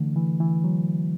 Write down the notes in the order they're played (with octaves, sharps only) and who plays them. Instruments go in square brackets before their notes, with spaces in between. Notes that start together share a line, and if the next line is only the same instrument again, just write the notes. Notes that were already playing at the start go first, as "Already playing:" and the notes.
Already playing: [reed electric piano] D3 E3 A3
E3
E3
F#3